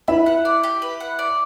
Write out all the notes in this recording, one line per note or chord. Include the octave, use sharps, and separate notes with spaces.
E4 B4 E5
F#5
D5
G4
B4
F#5
D5